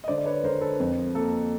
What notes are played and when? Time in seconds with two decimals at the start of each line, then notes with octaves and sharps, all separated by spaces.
0.04 D#5
0.08 D3 C5 D5
0.18 D5
0.26 B4 C#5
0.44 D3 A#4 C5
0.61 A4 B4
0.80 F2
1.14 A#3 A4